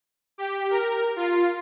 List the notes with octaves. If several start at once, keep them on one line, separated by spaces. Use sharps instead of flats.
G4
A#4
F4